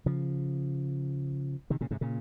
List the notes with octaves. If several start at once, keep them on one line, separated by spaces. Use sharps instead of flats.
C#3 F3
C3 D#3
A#2 C#3
G#2 C3
A#2 C#3